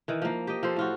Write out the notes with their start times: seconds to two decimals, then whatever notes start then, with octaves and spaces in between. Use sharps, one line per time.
0.08 D#3 E3
0.22 F3 A#3
0.47 G4 D#5
0.63 F3 A4 C5
0.76 A2 F4 F#4